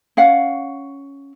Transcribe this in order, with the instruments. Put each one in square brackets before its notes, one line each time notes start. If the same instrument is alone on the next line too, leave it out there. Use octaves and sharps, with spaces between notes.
[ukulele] C#4 F5 F#5